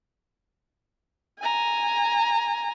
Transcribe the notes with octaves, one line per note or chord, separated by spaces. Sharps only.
G#5 A#5